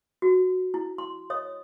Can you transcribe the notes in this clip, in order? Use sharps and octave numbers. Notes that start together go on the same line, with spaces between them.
F#4
E4
C6
C#5 D#5 D#6